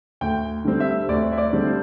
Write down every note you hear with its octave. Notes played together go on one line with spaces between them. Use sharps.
D2 G5
D3 G3 C4
E5
D2 D5
E5
D5
D3 G3 C4
C5